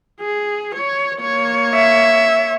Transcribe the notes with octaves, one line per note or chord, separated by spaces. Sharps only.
G#4
C#5
A#3 C#5
E5